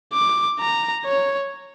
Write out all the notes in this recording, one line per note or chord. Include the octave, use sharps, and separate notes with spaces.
D6
A#5
C#5